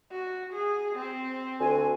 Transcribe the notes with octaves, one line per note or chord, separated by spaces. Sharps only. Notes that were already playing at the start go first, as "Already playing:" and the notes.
F#4
G#4
C4
D2 G#5